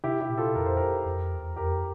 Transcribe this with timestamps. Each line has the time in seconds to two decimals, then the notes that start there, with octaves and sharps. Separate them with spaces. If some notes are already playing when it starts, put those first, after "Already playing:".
0.04 C3 E4 G4
0.21 E4 G4
0.29 A#2
0.38 F4 A4
0.55 F2 A#4
0.66 C5
0.77 G4 A#4
1.06 F2
1.32 E2
1.56 F2 G4 A#4